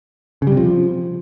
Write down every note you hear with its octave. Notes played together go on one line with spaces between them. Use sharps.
C#3
G3
C3
F3